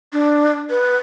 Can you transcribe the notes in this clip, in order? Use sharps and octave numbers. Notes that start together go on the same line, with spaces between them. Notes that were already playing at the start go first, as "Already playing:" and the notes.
D4
B4